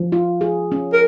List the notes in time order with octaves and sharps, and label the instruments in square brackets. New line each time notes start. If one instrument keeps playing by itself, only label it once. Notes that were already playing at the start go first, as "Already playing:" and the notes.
Already playing: [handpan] F3
F4
G#4
C#4
[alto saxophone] A#4